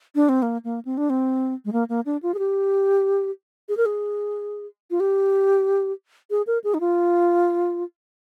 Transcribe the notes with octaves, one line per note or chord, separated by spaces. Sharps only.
D4
C4
A#3
A#3
C4
D4
C4
G#3
A#3
A#3
D4
F4
G#4
G4
G#4
A#4
G#4
F4
G4
G#4
A#4
G#4
D#4
F4